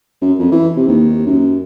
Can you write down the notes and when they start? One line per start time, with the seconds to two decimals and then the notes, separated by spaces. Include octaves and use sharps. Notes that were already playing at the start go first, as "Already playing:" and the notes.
0.22 F#2
0.39 F2
0.52 E3
0.76 C3
0.88 D#2
1.26 F#2